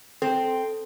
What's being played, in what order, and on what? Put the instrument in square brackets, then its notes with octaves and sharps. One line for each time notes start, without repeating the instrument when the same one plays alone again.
[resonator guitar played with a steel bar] C4 [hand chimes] A4